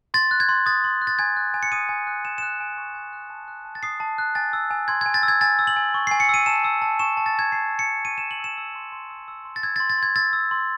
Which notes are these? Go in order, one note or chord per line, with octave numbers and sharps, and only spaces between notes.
C6 A6
F#6
G#6
C6
D#6 A6
C6
F#6
A6
G#5 G#6
F#6
G#5
C#7
D#6 D#7
G#5
F#6
G#5 E7
E7
F#6
G#5
C#6
G#5
F#6
A5
F#6
A5
A6
D#6 C7
A5
F#6
G#5 A6
E6
G#5
C6 G#6
G#6
G#5
A6
E6
G#6
G#5 A6
E6
F#7
G#5
C#6
G#5 C7
C#7
E6 D#7
A5 E7
E6
A5
C#6 E7
A5
A6
E6 G#6
A5 C7
E6
C#7
A5
C#6 D#7
E7
A5
F#7
E6 E7
E6
C6
C6
E6
E6
C6
A6
E6 G#6
A6
C6
A6
C6 G#6
E6 A6
E6
C6